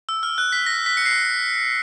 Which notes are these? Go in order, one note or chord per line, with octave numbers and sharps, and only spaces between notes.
E6
F6
F#6
B6
A#6
B6
C#7
C7